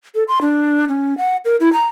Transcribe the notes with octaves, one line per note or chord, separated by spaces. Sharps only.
A4
C6
D4
C#4
F#5
A#4
E4
A#5